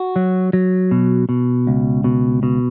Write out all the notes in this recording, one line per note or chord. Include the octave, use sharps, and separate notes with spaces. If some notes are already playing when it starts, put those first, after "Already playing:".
Already playing: F#4
F#3
F#3
B2
B2
C#2
B2
B2